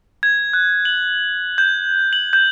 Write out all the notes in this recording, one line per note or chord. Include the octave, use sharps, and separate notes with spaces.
G#6
F#6
F#7
G6
F#7
G6